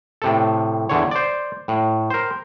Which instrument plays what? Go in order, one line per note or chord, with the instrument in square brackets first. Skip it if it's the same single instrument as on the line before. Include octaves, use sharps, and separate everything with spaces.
[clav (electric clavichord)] A2 C3 A4
E2 D3 C#5
C5 D5
A2
A#4 C5